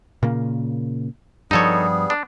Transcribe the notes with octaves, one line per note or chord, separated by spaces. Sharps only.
A#2 C#3 A#3
G2 F3 G3 B3 D#4 G#4 A4 C#5
D4